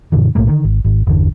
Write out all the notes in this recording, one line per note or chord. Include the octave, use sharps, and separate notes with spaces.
F#2 A#2 D3 E3
B1 A2 A3 A#3
D3 D#3
G#1
G#1
G1 E2 D3